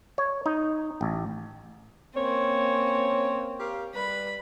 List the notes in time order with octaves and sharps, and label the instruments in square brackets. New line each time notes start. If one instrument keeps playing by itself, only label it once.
[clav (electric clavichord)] C#5
D#4
A1
[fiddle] A#3 C4 [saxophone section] C#4 C#5
[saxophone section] G4 A#4 F5
[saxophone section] G3 B4 [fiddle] B5